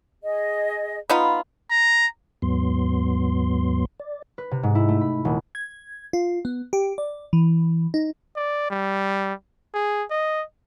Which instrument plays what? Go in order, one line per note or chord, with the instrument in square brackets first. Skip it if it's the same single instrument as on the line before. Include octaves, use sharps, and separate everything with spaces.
[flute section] G#4 D#5
[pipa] B3 D#4 F4 [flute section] B5
[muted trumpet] A#5
[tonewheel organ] D#2 G#2 F#3 B3 C6
D5
[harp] B4
C3
G#2
E4
A3
B5
D#1
[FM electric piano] G#6
F4
B3
G4
D5
E3
D#4
[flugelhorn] D5
G3
G#4
D#5